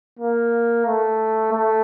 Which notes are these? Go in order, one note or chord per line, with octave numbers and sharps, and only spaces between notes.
A#3
A3
A3